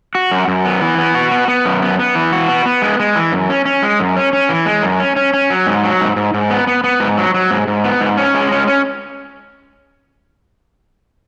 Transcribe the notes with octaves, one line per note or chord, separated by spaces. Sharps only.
F#4
F#2
F#2
B3
E3
B3
F#4
B3
B3
F#2
B3
B3
E3
F#4
B3
B3
G#3
G#3
E3
F#2
C#4
C#4
G#3
F#2
C#4
C#4
E3
G#3
F#2
C#4
C#4
C#4
F#3
G#2
F#3
G#2
G#2
G#2
B3
B3
B3
G#2
F#3
F#3
G#2
G#2
B3
G#2
C#4
G#3
C#4
C#4